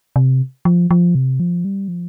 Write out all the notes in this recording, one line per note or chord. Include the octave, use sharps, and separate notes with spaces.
C3
F3
F3
C3
F3
G3
F3